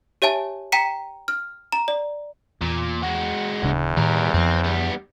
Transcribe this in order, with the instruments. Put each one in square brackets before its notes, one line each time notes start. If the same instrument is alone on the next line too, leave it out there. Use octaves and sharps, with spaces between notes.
[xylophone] G4 C#5 E5 G#5 A5
G5 A#5 B6 C#7 D#7
F6
A#5
D5
[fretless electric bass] E2 [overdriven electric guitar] A#2
[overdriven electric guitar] G#3 F#4
[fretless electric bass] D1 C#3 D4 [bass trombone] E2
[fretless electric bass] A2 D#3 [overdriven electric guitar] G3 A#4
[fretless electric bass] F2 F3 [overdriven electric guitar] C4
[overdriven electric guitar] G3 B3